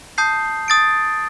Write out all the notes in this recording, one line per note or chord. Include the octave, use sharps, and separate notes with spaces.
A5 D#6 G6 C7
D#6 A6 D7